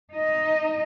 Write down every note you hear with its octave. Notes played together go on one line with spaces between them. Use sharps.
D#4 D#5